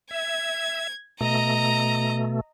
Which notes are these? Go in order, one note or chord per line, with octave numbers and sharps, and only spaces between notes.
E5 G#6
B2 A3 D#5 A#5